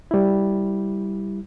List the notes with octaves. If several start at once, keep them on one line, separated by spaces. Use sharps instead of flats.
G3 E4